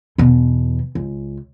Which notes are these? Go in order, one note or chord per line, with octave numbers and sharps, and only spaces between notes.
E2 B2
C#2